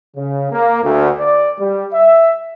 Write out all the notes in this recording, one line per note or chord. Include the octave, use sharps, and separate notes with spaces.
C#3
A#3
D2
D5
G3
E5